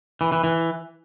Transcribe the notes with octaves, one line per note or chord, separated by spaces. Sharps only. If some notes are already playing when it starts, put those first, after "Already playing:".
E3
E3
E3